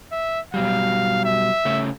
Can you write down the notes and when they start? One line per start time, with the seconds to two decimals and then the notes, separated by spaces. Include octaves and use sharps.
0.12 E5
0.54 B2 F#3 G3 F5
1.25 E5
1.65 C#3 A3 C#4